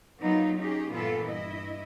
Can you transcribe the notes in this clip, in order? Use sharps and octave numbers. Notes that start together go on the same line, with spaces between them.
F#3 A#3 B3 D#4 F4
C#4 D#4 G4 G#4
G2 A#2 E3 B3 F4 A4
G2 E4 D#5